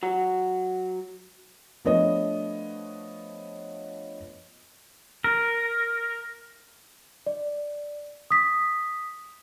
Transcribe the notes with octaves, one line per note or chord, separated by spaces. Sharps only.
F#3 F#4
F3 A3 B3 D4 C#5 D#5
A#4
D5
D#6 B6